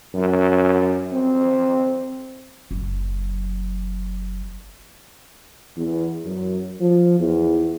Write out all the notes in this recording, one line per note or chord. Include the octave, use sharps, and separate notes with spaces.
F#2
C4
F#1 F#3
E2
F#2
F3
E2